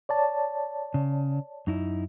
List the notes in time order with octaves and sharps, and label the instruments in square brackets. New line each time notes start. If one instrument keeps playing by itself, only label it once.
[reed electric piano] C#5 D5 A5
[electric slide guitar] C#3
F#2 D#4 E4